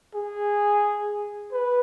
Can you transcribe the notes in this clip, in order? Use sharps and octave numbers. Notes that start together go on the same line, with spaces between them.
G#4
B4